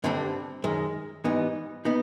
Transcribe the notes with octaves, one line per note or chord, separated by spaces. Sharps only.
G2 D3 G3 C4
F#2 D#3 G#3
G#2 E3 G3 B3 D#4
B3 D#4